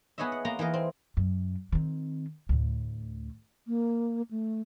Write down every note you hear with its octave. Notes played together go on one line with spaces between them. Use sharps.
B3 G#4 B4 C#5 D#5 E5
F#5
A#3 B3 A#5 C6
E3 A#3 A#4 D#5
C4
F#2
D#3 C4
D2 A2
A#3
A3